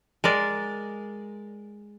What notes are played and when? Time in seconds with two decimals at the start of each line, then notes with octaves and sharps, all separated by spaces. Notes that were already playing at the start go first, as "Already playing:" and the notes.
0.24 G#3 A#4 D5